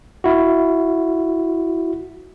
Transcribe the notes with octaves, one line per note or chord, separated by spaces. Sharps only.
E4 F#4